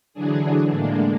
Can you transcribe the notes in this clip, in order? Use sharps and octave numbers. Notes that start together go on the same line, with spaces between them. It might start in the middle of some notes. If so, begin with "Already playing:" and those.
D3 E3 F#3 D4 G#4
A2 D3 G#3 A#3 D4